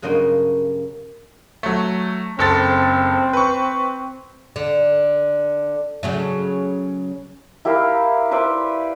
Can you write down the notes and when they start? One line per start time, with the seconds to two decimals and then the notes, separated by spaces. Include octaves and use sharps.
0.02 G2 C#3 F#3 A#3 D#5 C6
1.63 F#3 A3
2.39 F#1 C4 A4 A6
3.33 B4 C#6
4.56 D3
6.03 C#3 F#3 A3
7.65 E4 G4 A#4 F5
8.31 B4 C5 D5 E5